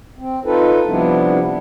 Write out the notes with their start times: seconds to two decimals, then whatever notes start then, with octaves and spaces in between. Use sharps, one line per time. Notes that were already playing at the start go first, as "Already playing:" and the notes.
0.19 C4
0.45 D#4 F4 A4 B4
0.87 C3 F3 G3 B3 D4 E4